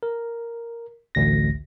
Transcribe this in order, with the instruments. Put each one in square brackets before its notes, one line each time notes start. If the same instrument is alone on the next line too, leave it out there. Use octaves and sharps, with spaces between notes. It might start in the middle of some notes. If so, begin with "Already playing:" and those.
[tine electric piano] A#4
A1 D2 A#6